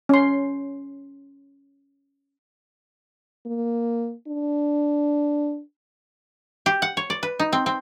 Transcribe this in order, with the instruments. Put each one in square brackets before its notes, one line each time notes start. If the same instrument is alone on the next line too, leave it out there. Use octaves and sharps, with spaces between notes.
[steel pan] C#4 C6
[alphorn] A#3
D4
[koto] G4
F#5
C#5
D5
B4
D#4
C4
C4